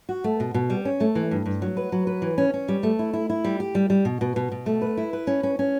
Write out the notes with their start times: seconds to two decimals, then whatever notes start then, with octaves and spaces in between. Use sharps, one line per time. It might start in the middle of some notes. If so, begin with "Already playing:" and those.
0.09 F#4
0.24 A3
0.40 B2
0.54 B2
0.70 G3
0.85 C#4
1.00 A3
1.15 E3
1.31 G2
1.46 G2
1.62 F#3
1.77 B4
1.92 F#3
2.07 B4
2.22 E3
2.38 C#4
2.54 C#4
2.68 G3
2.83 A3
2.99 E4
3.13 E4
3.30 E4
3.44 G3
3.60 G4
3.75 G3
3.90 G3
4.05 B2
4.21 B2
4.36 B2
4.52 B2
4.66 A3
4.82 B4
4.97 E4
5.13 B4
5.27 C#4
5.43 C#4
5.59 C#4